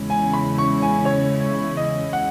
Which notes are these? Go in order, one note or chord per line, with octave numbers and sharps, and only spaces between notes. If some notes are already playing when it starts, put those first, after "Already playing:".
Already playing: E2 C#3 G#3 C#4 E4
G#5
B5
C#6
G#5
C#5
D#5
F#5